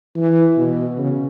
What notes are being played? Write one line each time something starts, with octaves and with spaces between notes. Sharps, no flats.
E3
B2
C#3